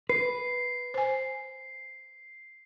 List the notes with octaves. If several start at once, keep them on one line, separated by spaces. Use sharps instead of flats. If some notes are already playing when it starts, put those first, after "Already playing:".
B4 C7
C5 G#5